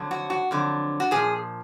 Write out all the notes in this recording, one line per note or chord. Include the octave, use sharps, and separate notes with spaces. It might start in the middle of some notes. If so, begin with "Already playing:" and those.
Already playing: F2 D3 F#3
F#4
F#4
F2 D3 F#3
F#4
A#2 F3 G#4